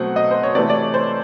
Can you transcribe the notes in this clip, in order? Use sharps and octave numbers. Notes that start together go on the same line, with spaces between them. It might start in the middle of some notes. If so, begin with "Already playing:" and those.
Already playing: B2 F#3 A3 C4 F#5
D#5
C5
C#5
C3 E3 A3 D5
D5
C#5
C5